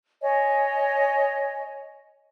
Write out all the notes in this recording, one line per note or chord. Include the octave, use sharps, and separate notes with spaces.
C#5 D#5 G#5